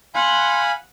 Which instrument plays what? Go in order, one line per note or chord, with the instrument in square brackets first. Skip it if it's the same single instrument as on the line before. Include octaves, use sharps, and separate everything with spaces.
[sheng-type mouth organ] F5 G#5 B5 [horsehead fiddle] F#5 [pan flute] C6